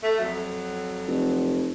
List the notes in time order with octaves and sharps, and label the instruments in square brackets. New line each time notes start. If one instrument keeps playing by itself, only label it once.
[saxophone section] A3
F2 F#3
[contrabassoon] F1